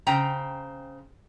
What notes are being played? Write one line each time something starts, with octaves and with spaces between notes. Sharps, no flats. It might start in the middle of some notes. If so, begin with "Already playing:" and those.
C#3 C4 G5 A#5